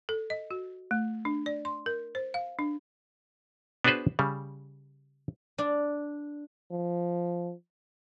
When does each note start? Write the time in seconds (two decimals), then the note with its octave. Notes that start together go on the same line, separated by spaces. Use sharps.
0.09 A4
0.30 D#5
0.51 F#4
0.91 A3
1.25 D4
1.46 D5
1.65 C6
1.86 A#4
2.15 C5
2.34 F5
2.59 D4
3.84 B3 D4 F#4 G#4 B4 C5
4.19 C#3 G3
5.58 D4
6.71 F3